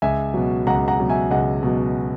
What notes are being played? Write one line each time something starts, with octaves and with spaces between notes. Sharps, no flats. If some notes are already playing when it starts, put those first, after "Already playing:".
C#2 E5 G#5
B2 F#3
C#2 F#5 A#5
F#5 A#5
B2 F#3
E5 G#5
C#2 D#5 F#5
B2 F#3